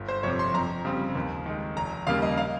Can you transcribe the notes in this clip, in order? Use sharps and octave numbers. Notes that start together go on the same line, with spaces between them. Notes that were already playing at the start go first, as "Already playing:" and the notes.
Already playing: G1
C5
F2 C3 C#5
C6
F2 A#5
C#3 G3 C4
D#2
D#3 G#3
F1 A#5
D#2 C#3 G3 A#3 F5
D#5
F5